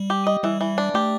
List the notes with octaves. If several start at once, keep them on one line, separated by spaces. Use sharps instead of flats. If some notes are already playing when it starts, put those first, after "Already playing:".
Already playing: G3
G4
D#5
E3 G3
E3
D4
A3 G4